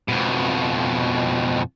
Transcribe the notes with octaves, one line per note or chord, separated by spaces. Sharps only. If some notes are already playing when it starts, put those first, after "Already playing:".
F2 B2